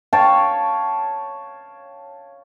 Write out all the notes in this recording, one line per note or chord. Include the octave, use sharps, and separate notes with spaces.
C#5 F5 G5 A5